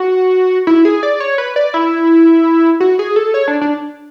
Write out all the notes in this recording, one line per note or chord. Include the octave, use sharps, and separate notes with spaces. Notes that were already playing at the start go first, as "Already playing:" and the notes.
Already playing: F#4
E4
G#4
D5
C#5
B4
D5
E4
F#4
G#4
A4
C#5
D4
D4